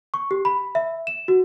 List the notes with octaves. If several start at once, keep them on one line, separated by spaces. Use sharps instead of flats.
C#6
G4
B5
E5
E7
F#4